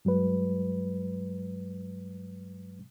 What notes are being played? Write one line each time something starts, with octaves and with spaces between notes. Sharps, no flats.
G2 F#3 G#3 B4